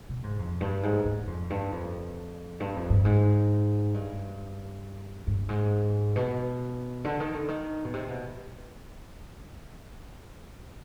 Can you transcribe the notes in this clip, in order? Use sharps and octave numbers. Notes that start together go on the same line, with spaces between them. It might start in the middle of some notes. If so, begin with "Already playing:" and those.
B2
G#2
F2
G2
G#2
G#2
F2
G2
F2
G2
F2
G2
G#2
G2
G2
G#2
B2
D3
D#3
D3
D#3
B2
C3
B2